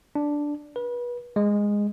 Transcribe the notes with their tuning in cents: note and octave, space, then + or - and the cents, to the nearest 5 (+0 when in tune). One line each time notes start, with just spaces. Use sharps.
D4 +0
B4 -30
G#3 -10